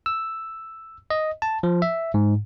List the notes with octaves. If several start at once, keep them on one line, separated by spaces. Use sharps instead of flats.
E6
D#5
A5
F3
E5
G#2